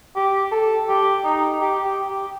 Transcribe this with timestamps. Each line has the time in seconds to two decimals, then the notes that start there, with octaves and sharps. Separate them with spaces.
0.16 G4
0.52 A4
0.88 G4
1.24 D#4
1.61 G4
1.84 G4
2.08 G4